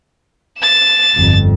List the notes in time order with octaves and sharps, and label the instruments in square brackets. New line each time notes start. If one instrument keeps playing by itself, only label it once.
[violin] A6 E7
[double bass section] G1 F2